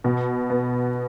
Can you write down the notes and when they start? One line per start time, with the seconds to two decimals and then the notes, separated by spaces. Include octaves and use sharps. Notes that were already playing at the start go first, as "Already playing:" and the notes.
0.04 B2
0.50 B3